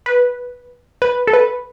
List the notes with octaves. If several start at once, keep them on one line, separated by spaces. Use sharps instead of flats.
B4
B4
A4
B4